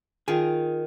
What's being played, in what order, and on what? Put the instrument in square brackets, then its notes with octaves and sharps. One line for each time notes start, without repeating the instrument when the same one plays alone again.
[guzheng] D#3 [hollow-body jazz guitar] F4 G#4